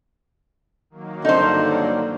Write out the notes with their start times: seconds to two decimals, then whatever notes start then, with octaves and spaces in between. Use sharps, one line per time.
0.90 D#3 F#3 A#3
1.25 G2 D3 D#4 C5